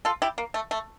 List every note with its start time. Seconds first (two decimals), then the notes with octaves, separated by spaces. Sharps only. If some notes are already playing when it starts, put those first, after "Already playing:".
0.05 F4 A4
0.22 E4 G4
0.38 A#3
0.54 A3
0.71 A3